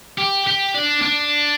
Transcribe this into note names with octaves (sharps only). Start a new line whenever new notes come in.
G4
G4
D4
D4